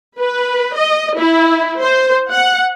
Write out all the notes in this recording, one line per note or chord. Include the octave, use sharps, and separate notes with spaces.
B4
D#5
E4
C5
F#5